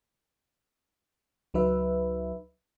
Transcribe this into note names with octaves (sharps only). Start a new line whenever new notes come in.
C#2 F#3 D#4 B4 E5